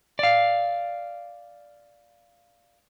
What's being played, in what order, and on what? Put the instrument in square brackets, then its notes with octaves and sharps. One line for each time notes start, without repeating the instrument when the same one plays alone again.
[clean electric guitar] D5 F5